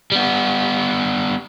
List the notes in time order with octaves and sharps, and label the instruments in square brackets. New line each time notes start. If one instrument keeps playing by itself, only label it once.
[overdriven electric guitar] G3 B3